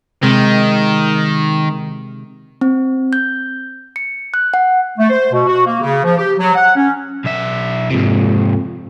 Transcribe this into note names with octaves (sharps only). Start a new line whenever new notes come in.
C3 D#3 G#3
C4
G6
C#7
F#6
F#5
A3
C5
B2
F#4
A#3
C#3
F3
G4
F#3
F#5
C#4
B1 E5
F2 G#2 C3